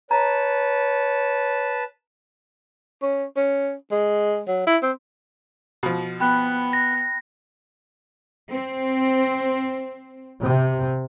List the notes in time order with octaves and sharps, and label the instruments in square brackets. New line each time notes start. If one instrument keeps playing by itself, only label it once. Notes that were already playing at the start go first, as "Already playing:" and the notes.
[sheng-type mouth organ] B4 A5 [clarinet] C#5 [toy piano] A#5
[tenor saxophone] C#4
C#4
G#3
F#3
E4
C4
[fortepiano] B2 F3
[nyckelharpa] B3 [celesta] G5 B5 F#6
[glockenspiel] A#6
[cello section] C4
[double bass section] C3